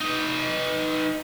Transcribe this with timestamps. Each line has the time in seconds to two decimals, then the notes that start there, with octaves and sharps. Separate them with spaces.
0.01 D#4 B4